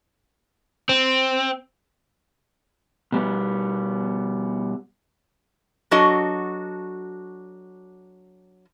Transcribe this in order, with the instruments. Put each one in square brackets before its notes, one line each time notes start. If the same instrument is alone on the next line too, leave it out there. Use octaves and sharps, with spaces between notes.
[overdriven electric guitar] C4
[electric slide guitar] B2 G3 B3
[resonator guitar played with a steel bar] F#3 D4 F#4 A4 D#5